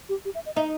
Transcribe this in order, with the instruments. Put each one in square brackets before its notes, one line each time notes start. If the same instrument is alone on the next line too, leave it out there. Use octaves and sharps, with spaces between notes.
[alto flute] G4
G4
E5
D#5
[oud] D#4 [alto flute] E5